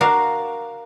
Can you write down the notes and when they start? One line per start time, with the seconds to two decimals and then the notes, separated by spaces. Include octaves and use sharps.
0.01 D4 F#4 A#4 D5 F5 A5